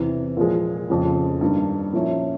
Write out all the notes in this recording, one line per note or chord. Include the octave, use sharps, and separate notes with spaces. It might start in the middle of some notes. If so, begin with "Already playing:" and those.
Already playing: E2 C3 E3
A#2 F3 G#3
F2 C#3 F3
G2 D#3 G3 A#3
A#2 F3 A#3 C#4 E4